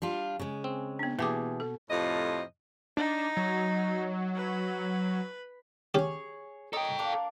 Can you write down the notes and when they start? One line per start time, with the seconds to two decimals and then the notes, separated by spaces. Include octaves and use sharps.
0.02 G3 D4 F4
0.39 C#3 G#3
0.64 C4
0.99 B3 D4
1.19 B2 E3 A#3 G4 G#4 A5 D6
1.60 A4
1.90 F2 A2 C3 F4 D#5
2.97 D4 D#4
3.37 F#3
4.36 B4
5.94 C#4 G4 G#4 C#5
6.73 A4 A#4 C#5 D#5 G5
6.99 A#3 D4 A#4